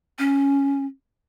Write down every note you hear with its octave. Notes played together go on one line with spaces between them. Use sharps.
C#4